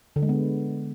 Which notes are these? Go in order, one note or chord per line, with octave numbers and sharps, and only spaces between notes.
D3
G#3
B3